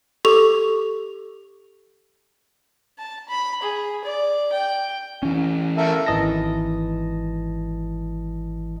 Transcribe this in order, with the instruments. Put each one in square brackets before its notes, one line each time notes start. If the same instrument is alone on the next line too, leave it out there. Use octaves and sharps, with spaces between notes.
[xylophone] G4 A4 C#6 F7
[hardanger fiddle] A5
B5
G#4
D5
G5
[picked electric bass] E3 C#4
[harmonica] A4 A#4 E5
[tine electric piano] G#1 E3 D#5 A5 A#6